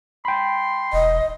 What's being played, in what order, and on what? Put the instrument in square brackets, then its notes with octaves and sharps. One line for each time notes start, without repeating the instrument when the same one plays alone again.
[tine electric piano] G5 B5 [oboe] C6
[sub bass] E1 [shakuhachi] D#5